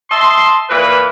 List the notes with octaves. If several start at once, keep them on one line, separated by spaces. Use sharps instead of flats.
D#5 E5 A5 C6
A#2 E3 B4